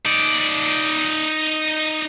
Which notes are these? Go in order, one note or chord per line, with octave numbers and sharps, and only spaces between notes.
D#4 D5